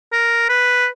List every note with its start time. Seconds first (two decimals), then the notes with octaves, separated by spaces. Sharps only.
0.12 A#4
0.49 B4